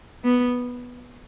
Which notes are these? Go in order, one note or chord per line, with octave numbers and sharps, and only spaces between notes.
B3